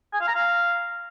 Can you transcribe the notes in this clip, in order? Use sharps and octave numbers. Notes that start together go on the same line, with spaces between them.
G#5
F5
A#5
F5